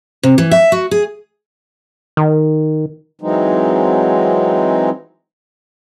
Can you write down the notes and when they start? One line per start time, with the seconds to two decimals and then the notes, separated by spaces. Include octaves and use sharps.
0.23 C3
0.38 E3
0.51 E5
0.72 F#4
0.91 G#4
2.17 D#3
3.21 E3 F#3 G#3 C4 D#4